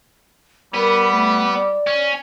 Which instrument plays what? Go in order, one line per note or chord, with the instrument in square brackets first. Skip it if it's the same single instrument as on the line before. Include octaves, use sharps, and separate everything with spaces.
[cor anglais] G3 [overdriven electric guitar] B3 [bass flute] A#4
[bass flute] A3
D5
[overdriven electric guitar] C#4